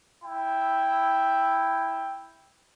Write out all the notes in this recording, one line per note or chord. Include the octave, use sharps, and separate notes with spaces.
E4 G5